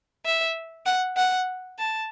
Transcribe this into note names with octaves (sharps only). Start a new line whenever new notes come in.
E5
F#5
F#5
A5